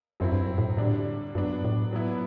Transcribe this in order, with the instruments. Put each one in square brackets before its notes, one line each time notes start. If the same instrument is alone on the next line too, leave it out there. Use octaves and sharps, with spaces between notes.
[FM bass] F#2 [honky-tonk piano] F#3 C4 E4
[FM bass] G2
F#2
A2
[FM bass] A2 [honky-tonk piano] D3 G3 D4
[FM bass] G2 [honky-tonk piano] F#3 B3 D4
[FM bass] A2
[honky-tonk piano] F#3 B3 E4